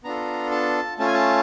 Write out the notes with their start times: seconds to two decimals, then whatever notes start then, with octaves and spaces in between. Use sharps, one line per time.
0.04 B3 D4 F4 A4 A#5
0.51 A5
0.99 A3 C#4 F4 A5
1.07 G#5
1.14 A5